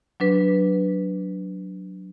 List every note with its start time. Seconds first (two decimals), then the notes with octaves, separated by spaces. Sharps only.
0.20 F#3 D4 B4